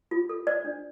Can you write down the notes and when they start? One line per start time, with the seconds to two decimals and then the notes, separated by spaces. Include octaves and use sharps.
0.11 F4
0.29 A4
0.47 C5 D5
0.65 D4